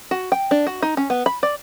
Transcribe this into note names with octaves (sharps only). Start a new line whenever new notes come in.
F#4
G5
D4
F#4
D#4
C#4
B3
B5
D5